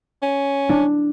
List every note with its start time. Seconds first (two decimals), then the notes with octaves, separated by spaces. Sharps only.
0.22 C#4
0.69 D4